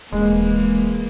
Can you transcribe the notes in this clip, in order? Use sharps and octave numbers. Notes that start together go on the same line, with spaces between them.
D#1 E3 G#3 A#3